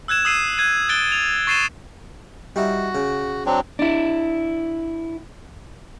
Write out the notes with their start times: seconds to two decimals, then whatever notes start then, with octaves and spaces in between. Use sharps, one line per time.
0.08 E6 F#6 G#6 E7
0.25 D#6 E6 C7 D#7
0.58 F#6 G#6 D#7
0.89 F#6 A6 D7 G7
1.12 F7
1.47 C#6 A6 C7 D#7 E7 G7
2.56 G3 D#4 E4 F#4
2.95 C#3
3.46 F#3 C4 D4
3.79 D4 E4